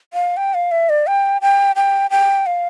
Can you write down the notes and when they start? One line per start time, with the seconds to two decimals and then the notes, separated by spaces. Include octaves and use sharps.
0.14 F5
0.37 G5
0.54 F5
0.71 E5
0.89 D5
1.07 G5
1.42 G5
1.76 G5
2.11 G5
2.46 F5